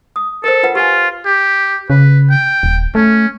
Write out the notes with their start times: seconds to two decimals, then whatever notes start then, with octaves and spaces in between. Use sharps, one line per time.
0.16 D#6
0.44 A4 A#4 C5
0.63 F4 B4 F#5
0.75 F4 G4 G#5
1.25 G4
1.90 C#3 B4
2.30 G5
2.63 D#1
2.95 A3 C#4